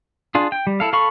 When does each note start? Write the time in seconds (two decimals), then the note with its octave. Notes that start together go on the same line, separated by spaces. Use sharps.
0.35 D4 F4 G#4
0.52 G5
0.67 G3
0.80 E4 A4 F5
0.93 A4 F5 B5 C#6